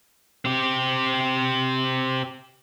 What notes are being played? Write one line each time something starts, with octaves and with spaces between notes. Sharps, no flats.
C4 G4